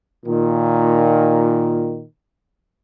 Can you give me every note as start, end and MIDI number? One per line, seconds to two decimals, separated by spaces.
0.26 2.02 46
0.26 2.02 51